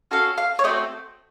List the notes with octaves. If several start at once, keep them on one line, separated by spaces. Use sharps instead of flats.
C#4 F#4 A4 F5
F5
C#5
A3 C4 F#4 A4 D#5